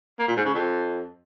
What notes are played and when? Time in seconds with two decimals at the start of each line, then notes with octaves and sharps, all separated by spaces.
0.19 A#3
0.28 A#2
0.37 G#2
0.45 C#3
0.54 F2